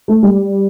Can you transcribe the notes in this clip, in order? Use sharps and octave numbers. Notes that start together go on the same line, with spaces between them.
A3
G3